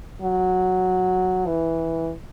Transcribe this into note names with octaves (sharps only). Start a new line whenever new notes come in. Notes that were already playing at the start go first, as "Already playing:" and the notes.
F#3
E3